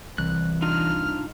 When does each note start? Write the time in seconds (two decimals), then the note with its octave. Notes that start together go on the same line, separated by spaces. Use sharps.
0.18 C2 E3 F#6
0.62 D4 D#4 F4 F6